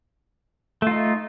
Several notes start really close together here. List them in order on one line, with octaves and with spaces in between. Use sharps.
A3 F4 D#4